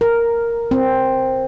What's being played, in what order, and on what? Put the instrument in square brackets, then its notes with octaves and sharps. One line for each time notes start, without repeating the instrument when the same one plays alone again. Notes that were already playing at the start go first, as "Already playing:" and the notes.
[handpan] A#4
C4